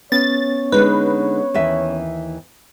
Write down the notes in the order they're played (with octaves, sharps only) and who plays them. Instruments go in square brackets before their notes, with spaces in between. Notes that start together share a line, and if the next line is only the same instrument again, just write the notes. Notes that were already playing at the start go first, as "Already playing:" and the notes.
[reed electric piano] B3 C#4 [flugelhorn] C#5 [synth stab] A6
[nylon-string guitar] D3 G#3 D#4 [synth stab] B4
[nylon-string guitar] D#2 E3 E5